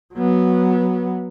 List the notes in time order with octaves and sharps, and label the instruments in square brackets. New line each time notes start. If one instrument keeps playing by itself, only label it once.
[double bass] F#3 B3